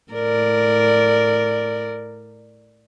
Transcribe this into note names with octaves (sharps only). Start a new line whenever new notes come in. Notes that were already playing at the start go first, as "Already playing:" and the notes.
A2 A#4 D5